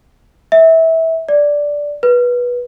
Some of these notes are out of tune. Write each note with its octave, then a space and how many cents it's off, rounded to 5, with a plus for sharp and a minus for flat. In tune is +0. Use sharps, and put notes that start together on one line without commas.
E5 -20
D5 -5
B4 -20